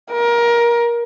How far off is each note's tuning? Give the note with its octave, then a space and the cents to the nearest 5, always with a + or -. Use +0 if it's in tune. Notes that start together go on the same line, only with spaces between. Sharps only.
A#4 +20